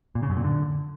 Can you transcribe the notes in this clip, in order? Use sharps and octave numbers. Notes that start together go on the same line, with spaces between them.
A#2
C#3
F#2
A#2
D3